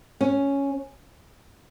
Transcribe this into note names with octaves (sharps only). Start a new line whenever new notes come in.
C#4